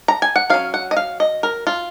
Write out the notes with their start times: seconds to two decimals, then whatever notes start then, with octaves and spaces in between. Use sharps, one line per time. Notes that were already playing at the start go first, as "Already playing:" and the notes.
0.08 A#5
0.22 G#5
0.36 F#5
0.50 F#3 C#4 F5
0.74 F#5
0.91 D#5
0.97 F5
1.20 D#5
1.43 A#4
1.67 F4